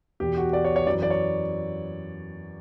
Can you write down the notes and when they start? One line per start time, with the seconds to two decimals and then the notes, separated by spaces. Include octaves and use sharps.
0.20 E2 B2 G4
0.37 F#4
0.53 D5
0.65 C#5
0.76 C#5
0.87 F#2 E3 D5
1.03 D5
1.10 C#5